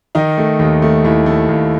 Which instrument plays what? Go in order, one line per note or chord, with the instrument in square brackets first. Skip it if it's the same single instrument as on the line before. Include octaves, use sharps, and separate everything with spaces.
[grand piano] D#3 D#4
A3
D#2
A3
D#2 E4
A3
D#2